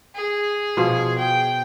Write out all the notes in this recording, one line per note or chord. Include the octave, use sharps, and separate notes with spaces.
G#4
B2 F3
G5